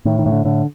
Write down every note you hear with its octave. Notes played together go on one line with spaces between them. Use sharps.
A2 D#3
D#3
A2
D3
A2 D3